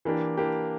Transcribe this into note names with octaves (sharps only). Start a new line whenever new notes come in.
E3 A#3 D4 G4
E3 A#3 D4 G4